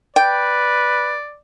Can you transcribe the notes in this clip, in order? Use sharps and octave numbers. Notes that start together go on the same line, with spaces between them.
B4 D5 G5